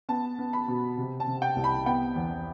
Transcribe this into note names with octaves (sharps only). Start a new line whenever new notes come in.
B3 A5
B3
B5
B2
C3
A5
C3
G5
C2
B5
B3 G5
E2